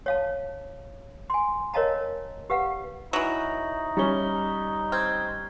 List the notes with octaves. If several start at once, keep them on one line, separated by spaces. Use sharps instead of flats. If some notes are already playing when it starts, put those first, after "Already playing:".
C#5 F5 A5
G#5 C6
A#4 C#5 D#5 F5 A5 A#5
G4 B4 F5 F#5
E3 F#3 D#4 C#6 A#6 F#7
G3 C#4 A#5 C#6 G7
C4 F6 G6 G#6